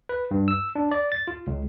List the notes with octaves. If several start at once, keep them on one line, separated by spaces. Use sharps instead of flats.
B4
G2
E6
D4
D5
A6
F4
C#2